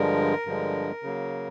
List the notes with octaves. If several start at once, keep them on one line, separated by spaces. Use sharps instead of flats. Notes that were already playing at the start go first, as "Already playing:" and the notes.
Already playing: G2 D3 F3 G#3 A#4
G2 D3 F3 G#3
C#3 F#3 A#3